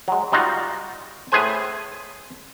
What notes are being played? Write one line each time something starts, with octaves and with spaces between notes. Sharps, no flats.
F#3 G#3
G3 D#4 F4 F#4
A2 G#4 B4 C5 G#5